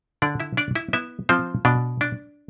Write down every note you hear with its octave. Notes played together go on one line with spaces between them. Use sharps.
D3 D4 D5
E4 E5
D4 D5
E4 E5
B3 E4 E5
F3 C4 C5
B2 D4
D4